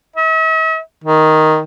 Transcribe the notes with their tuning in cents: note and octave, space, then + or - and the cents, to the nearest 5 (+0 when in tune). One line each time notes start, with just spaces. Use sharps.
E5 -45
D#3 +5